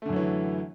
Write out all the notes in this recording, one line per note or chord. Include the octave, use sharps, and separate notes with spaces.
F#2 D3 E3 F#3 A3